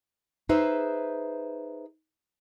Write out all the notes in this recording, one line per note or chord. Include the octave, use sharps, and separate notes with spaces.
D#4 G#4 B4 C5 E5